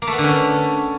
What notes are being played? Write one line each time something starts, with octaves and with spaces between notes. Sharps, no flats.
A#3
A3
B3
D3
C#4